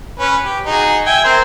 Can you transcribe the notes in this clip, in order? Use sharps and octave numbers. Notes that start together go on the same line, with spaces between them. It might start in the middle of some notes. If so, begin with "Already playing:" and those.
C#4 B4
G4
D#4 F#4 G#4
E5 G5 G#5
C4 A#4 C5